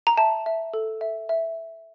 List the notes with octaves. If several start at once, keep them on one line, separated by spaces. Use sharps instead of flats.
A#5
E5 A5
E5
A4
E5
E5